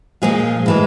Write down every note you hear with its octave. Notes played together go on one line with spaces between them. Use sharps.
A#2 F3 G#3 G#4
A2 E3 G#3